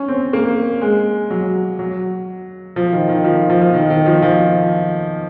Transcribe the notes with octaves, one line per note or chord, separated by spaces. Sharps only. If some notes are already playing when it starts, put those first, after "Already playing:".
Already playing: C#4
C4
A#3
G#3
F#3
F#3
F3
D#3
D#3
F3
F3
F3
D#3
D#3
F3
F3